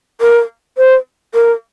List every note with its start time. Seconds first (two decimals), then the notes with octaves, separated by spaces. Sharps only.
0.21 A#4
0.78 C5
1.34 A#4